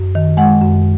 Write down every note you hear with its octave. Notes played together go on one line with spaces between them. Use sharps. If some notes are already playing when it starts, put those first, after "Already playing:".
Already playing: F#2
D#3
G#3 F#5
F#2